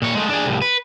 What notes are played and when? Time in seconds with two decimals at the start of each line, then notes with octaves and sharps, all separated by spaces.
0.02 A#2 C#5
0.15 G#3 A3
0.29 D4 G#4
0.46 C2 A2
0.62 B4